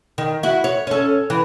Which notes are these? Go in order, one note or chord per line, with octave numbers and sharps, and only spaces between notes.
D#3
E4 F#4
C#5
C#4 A4
E3